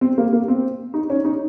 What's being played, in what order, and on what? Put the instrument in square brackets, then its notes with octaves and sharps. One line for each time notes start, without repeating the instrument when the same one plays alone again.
[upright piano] C4
A#3
A#3
C4
D#4
C#4
D#4